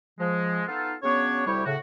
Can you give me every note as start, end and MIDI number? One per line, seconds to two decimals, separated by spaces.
0.20 0.63 53
0.20 0.63 56
0.68 0.95 59
0.68 0.95 63
0.68 0.95 65
0.68 0.95 69
1.03 1.44 49
1.03 1.44 54
1.03 1.44 59
1.03 1.44 61
1.03 1.44 62
1.03 1.44 73
1.47 1.64 38
1.47 1.64 48
1.47 1.64 55
1.47 1.64 64
1.47 1.64 67
1.47 1.64 73
1.66 1.77 45
1.66 1.77 49
1.66 1.77 66